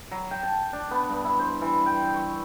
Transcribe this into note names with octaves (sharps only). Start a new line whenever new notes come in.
F#3
G5
A5
D4
B3
G2
E4
C5
E3
G5
C#6